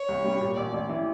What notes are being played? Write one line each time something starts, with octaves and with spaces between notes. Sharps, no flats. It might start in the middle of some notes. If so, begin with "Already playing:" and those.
Already playing: C#5
C2
G3
A#2
A1 D5
A1
E3